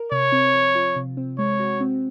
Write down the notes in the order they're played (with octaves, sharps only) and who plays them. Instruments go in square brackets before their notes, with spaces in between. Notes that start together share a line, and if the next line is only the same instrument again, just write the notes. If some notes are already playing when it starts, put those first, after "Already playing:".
Already playing: [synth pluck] A#4
[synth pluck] C3 [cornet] C#5
[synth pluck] C4
F3
F4
C3
C4
[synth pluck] G#3 [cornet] C#5
[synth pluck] F#4
C4